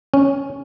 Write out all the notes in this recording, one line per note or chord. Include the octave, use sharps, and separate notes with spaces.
C#4